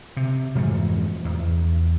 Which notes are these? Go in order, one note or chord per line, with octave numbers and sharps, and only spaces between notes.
C3
F2 G#2 E3 A3
E2